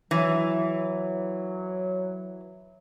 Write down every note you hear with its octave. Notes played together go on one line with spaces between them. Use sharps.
E3 F#3